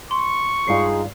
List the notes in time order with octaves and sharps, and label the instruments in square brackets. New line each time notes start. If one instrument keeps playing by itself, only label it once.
[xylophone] C6 [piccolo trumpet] C#6
[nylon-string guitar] G2 F4 D5 [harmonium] G#3 D#4 G#4 [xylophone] C7